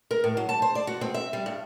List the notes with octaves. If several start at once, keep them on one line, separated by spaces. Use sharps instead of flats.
A#4
A2
F#3
A5
C5
D5
F#4
C4
E5
G3
G2